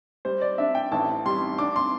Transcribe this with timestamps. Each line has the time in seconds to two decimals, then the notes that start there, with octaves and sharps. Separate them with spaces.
0.25 G3 C5
0.42 D5
0.58 D4 E5
0.75 G5
0.92 A1 A5
1.26 G3 C6
1.58 D4 D6
1.76 C6